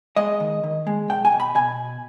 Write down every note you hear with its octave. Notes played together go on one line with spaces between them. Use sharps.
G#3 D#5
D#3
D#3
G#3
B1 G5
G#5
B2
B5
B2 G#5